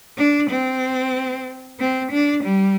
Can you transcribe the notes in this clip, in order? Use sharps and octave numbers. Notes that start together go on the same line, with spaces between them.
D4
C4
C4
D4
G3